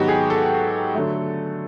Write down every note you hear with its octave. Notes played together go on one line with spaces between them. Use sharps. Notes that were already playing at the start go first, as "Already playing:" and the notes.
Already playing: G#2 D#3 F#3 B3 D#4 F#4 G4
G#4
A4
D3 F#3 A3